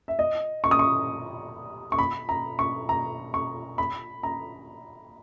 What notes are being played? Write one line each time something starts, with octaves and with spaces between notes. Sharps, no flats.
E5
D#5
C#6
D#6
C#6
C#6
B5
A#5
C#6
A#5
C#6
B5
A#5